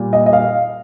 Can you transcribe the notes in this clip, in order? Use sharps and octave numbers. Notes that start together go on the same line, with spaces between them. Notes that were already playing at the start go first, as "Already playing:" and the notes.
Already playing: A#2 G3
D#5
D#5
F5